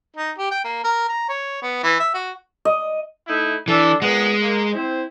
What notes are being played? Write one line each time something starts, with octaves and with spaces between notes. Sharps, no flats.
D#4
G4
G5
A#3
A#4
A#5
C#5
B3
E3
E5
F#4
D#5
A3 D#4 E4
E3 D4 A4
A#2 G#3 B3 F#5
A#3
C4 E4 C5